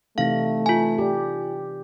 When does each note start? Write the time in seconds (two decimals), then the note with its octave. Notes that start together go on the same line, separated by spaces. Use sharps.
0.18 C3 E3 A3 D#4 F5 A#6
0.66 F4 G#5
0.98 G4 D5